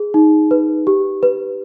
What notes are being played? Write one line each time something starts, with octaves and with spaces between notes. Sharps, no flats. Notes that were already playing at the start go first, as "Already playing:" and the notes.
Already playing: G#4
D#4
B4
G4
B4